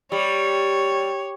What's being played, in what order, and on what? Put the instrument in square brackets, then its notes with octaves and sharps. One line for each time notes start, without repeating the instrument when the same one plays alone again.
[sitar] G3 [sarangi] C#5